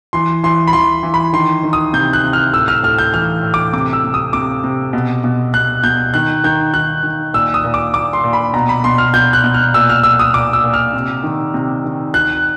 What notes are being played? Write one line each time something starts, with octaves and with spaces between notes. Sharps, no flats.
E3 C6
E3 C6
B5
E3 C6
E3
B5
D#3 C6
D#3
D#6
C3 G6
F#6
C3
F6
A2 E6
F6
A2 F6
G6
E3 F6
A2
D6
C3 D6
E6
C3
D#6
C3 D6
C3
B2
B2
B2 F#6
B2 G6
D#3 F#6
D#3 G6
D#3 F#6
D#3
A#2 E6
D#6
A#2
D6
A#2 D6
C6
A#2
B5
B2 A#5
B5
B2 C6
F6
B2 G6
F#6
B2
F6
A#2 E6
F6
A#2 E6
D#6
A#2 D6
E6
A#2
F6
C3
D#3
C3
D#3
D#3 F#6